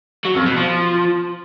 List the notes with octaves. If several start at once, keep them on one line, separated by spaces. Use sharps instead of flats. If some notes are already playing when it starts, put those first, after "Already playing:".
F#3
F2
B2
F3